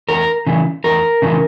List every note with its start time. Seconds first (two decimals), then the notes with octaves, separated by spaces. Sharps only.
0.09 E2 A#4
0.47 C#3 E3
0.84 E2 A#4
1.22 C#3 E3